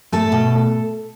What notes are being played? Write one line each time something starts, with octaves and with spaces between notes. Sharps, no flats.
A3 A4 A5
B2